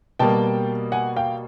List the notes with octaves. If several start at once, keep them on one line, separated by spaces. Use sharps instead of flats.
B2 G3 A#3 G5 A5
F#5 G#5
F5 G5